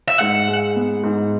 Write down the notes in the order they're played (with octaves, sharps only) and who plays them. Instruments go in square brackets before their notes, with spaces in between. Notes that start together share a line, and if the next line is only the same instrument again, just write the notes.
[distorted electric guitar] E5
[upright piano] G#2 [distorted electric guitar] F#5
[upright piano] G#3
B3
G#2